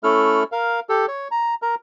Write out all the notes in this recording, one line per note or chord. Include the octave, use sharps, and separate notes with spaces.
A3 C#4 E4 A4 F6
A#4 F5
G4 A4
C#5
A#5
A#4 A#5